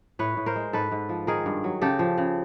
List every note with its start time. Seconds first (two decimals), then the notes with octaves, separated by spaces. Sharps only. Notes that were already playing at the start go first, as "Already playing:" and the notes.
0.19 A2 B4 C#5
0.37 A2
0.46 A#4 C5
0.56 G#3
0.73 G#2 A4 B4
0.92 G#2
1.09 F3
1.27 D#3 G#4 A#4
1.46 G2
1.64 F#3
1.82 C#3 G4 A4
1.99 F3
2.18 C#3